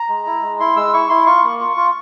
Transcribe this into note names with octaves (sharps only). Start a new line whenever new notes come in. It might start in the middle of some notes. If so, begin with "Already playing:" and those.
Already playing: A#5
G#3
E4
G#3
E4 C6
G#3 E6
E4 C#6
E4 C6
F4 C#6
A#3
F4
F4